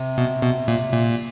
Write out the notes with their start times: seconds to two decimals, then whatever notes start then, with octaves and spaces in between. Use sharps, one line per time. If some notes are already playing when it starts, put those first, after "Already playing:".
Already playing: C3
0.17 B2
0.42 B2
0.68 A#2
0.93 A#2